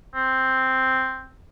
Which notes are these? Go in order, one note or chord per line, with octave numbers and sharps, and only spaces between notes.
C4